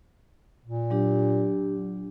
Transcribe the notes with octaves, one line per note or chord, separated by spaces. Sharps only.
A#2
F#3 D4 G4